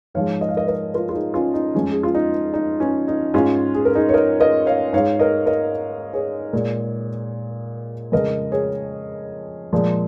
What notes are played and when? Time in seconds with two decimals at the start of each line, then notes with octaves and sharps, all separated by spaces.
0.14 G#2 F3 G#3 C#5 F5
0.41 D#5
0.49 F5
0.57 A#4 D#5
0.68 A#4 D#5
0.94 F4 A#4
1.09 F4
1.14 D#4 G#4
1.34 C#4 F4
1.54 D#4
1.75 F2 F3 G#3 C#4
1.91 G#4
2.03 F4
2.15 D#4
2.54 D#4
2.80 C#4
3.08 D#4
3.34 G#2 G#3 C#4 F4
3.74 G#4
3.85 A#4
3.95 D#4 G#4
4.09 C#5
4.14 A#4 D#5
4.40 A#4 D#5
4.66 C#5 F5
4.93 G#2 G#3 C#5 F5
5.19 A#4 D#5
5.46 A#4 D#5
6.13 G#4 C#5
6.53 A#2 G#3
8.12 F2 C#3 F3 G#3 A#4 D#5
8.52 G#4 C#5
9.73 A#2 F3 G#3